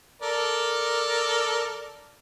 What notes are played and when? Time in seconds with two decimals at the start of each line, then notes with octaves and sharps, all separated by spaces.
0.22 A4 A#4 D5